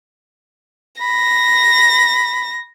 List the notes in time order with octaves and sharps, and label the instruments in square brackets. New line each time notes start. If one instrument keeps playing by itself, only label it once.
[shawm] B5 [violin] A#6